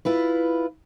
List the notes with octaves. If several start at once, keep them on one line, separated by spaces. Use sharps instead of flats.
E4 F4 B4